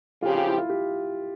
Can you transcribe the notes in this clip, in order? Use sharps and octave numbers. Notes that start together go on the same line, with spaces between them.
C#3 F3 C4 F4 G4
F4
E4
F4
G4